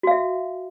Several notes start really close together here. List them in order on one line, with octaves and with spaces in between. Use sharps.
F#4 F5 E5